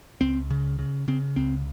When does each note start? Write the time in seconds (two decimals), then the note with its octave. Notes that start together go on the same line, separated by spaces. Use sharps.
0.21 C#2 C4
0.50 C#3
0.79 C#3
1.08 C#3 C4
1.36 C#2 C4